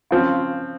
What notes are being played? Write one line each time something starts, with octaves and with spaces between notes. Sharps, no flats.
C#3 F3 C4